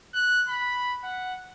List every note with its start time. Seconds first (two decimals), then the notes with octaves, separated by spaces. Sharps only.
0.14 F#6
0.49 B5
1.04 F#5